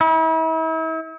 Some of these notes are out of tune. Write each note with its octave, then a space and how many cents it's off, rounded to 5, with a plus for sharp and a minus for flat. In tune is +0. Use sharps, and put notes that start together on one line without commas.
E4 -40